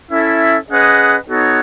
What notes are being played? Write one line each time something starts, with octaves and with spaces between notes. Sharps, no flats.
C#4 E4 A4 E5
C#4 G#4 B4 D#5 F#5
B3 D#4 F#4 A4 C#5